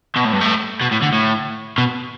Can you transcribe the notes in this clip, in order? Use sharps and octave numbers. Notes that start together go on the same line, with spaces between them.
B2
A2
G2
A2
B2
A2
D3
A2
B2